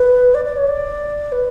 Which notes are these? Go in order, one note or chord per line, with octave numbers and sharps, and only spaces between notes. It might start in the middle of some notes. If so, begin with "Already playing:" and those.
Already playing: B4
D5
D5
C#5
D5
B4